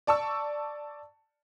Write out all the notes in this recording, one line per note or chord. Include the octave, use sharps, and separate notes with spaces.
D5 A5 C#6 E6